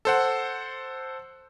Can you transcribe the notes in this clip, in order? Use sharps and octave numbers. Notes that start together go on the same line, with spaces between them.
A4 C5 F#5